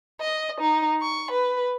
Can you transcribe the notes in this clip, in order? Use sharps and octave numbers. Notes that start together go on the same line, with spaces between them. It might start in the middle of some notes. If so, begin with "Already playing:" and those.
D#5
D#4
C#6
B4